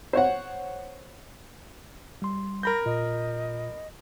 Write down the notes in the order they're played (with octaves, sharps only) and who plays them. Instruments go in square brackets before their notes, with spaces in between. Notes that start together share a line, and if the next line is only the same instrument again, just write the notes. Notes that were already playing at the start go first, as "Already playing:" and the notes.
[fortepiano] C5 C#5 F#5
[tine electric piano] G3 C6
[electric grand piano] A#4 B5 G6 [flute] A#6
[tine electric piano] A#2 F4 [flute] D#5